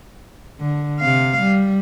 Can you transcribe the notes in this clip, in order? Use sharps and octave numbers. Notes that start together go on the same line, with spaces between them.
D3
C3 F5
G3